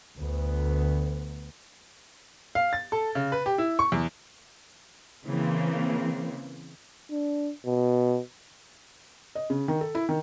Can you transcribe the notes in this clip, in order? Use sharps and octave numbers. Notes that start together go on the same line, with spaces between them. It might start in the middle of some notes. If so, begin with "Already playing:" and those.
D2 B3
F5
A6
A4
C#3
B4
G4
E4
C#6
E2
C#3 E3 A#3 C4
D4
B2
D#5
C#3
D#3
A4
E4
D#3